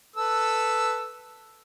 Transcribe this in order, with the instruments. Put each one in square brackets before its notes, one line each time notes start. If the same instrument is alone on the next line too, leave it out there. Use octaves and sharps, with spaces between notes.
[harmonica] A4 B4 E6